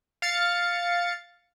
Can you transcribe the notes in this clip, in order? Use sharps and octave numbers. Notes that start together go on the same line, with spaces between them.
F5 A6 C#7